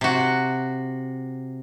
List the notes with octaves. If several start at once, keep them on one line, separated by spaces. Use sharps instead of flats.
C3 F#4